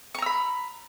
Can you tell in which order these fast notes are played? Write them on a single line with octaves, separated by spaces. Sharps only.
C#6 A#5 E6 B5